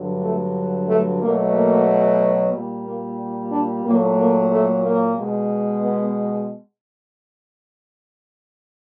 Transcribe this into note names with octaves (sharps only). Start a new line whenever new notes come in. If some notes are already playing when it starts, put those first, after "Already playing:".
Already playing: G2 D3 F#3
A3
A3
B2 F#3 A3 A#3
A#3
A#2 G3
A#3
D4
A#2 F#3 A3 A#3
A#3
A3
A#3
B2 G#3
B3